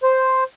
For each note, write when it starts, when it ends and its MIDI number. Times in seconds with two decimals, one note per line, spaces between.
0.03 0.44 72